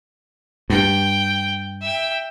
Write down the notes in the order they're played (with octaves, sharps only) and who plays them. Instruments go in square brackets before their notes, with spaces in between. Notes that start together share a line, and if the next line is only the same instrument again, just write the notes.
[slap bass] G2 [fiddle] G5
[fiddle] E5 G5